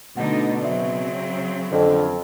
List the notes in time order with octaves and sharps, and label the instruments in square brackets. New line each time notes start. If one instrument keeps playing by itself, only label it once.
[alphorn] B2 [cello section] D3 A3 D#4 [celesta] F#5
[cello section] C#3 F#3 C4 [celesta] D5 E5
[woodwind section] F2 [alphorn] D3